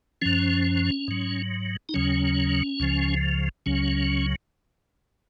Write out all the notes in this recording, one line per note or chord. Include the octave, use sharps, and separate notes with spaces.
F#2 F3 C#4
G#2 F#3
D#4
D#2 C#3 F#3 C#4
C#2 C#3 F3
C#2 C#3 F#3 C#4